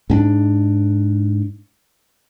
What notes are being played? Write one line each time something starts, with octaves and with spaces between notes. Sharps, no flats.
G#2 C#4 D4